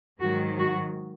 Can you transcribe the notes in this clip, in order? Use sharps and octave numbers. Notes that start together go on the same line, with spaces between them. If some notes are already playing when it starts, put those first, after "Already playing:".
G#2 D#3 F#3 F#4
F#4